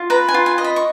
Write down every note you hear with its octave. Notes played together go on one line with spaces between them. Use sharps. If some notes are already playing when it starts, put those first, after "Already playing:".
Already playing: F4
B4 A#5
G#5
F4
G#5
D#5
B5
C#6